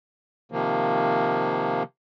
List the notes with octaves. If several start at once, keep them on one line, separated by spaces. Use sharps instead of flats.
C3 D#3 F3 A#3